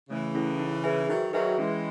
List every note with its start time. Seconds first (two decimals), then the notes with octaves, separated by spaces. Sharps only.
0.10 C#3 E3 A3
0.35 C#4 E4 A4
0.59 D#4
0.84 G#4 B4 E5 G#5
1.08 D#3 F#3 D#4
1.33 D#3 F#3 G#4 B4 E5 G#5
1.57 E3 G#3 C#4